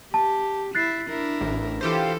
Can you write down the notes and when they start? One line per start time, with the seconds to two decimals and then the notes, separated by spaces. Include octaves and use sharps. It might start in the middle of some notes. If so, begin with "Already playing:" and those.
0.14 G4 A5
0.75 E4 F#6 A6 C7
1.09 D4 E4 A#4
1.41 A1
1.81 E3 F4 G4 A4 C5